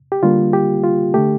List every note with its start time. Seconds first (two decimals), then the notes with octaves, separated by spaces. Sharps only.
0.12 G4
0.23 D3 G3 A#3 F4
0.53 G4
0.84 F4
1.14 D3 A3 G4